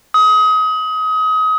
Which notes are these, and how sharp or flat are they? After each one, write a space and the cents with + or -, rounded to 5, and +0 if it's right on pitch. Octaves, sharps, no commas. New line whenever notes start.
D#6 +30